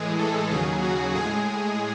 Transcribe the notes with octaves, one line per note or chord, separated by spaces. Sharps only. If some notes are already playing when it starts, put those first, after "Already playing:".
Already playing: A2 E3 G#3 G#4
A4
D#2 C#3 F#3 G#4
F#4
A2 G#3 G#4